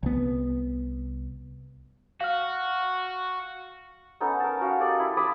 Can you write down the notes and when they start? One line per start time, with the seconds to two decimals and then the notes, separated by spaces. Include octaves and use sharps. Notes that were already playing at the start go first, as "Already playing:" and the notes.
0.03 C2 B3
2.21 F#4 F5 F6
4.20 B3 C#4 D#4 A4
4.40 A#4 A5
4.60 C#4 F#4 F5
4.79 G4 A4 D5 D#5
5.00 E4
5.17 A5 B5 D6 D#6